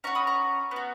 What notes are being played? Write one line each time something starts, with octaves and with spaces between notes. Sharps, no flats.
C#4 F#4 A#5 C#6
B5 D#6
A#5 C#6
B3
F#4